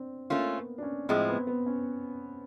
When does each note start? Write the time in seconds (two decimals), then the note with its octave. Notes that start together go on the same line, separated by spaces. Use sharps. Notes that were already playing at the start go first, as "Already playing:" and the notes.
Already playing: C4 D4
0.30 A3 A#3 C#4 F4
0.57 B3
0.78 D4
0.83 C#4
1.09 A2 F3 G#3 C4
1.28 B3
1.47 B3
1.66 C#4